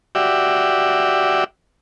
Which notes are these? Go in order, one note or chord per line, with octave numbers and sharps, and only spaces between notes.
F#4 G4 D5 E5